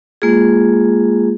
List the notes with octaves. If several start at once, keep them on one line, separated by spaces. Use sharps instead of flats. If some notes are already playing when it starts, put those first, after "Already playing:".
G#3 A#3 F4 G#4